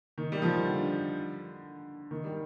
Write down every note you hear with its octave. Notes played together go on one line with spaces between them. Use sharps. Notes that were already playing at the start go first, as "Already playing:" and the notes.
D#3
G3
F3
D3
D#3
G3